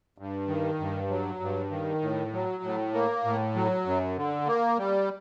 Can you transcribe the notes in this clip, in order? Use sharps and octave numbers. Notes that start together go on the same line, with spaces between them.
G2
D#3
G2
F#3
G2
D#3
A2
F#3
A2
A#3
A2
F#3
F#2
D3
A#3
G3